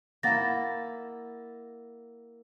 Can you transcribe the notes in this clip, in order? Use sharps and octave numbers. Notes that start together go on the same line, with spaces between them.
A#3 E4 F#5 A6 A#6